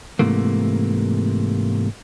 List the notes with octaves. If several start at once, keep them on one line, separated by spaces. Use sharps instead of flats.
G#2 C3 E3 A3 A#3